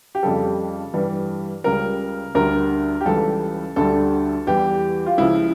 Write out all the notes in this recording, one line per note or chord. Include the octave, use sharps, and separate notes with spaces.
G4
F2 C#3 G3 A4
G2 E3 G3
C#2 C#3 G3 A#4
D2 D3 G3 A#4
G4
C#2 C#3 E3 G3 A4
D2 D3 G3 A4
E2 E3 G3 G4
F4
C#2 C#3 F3 E4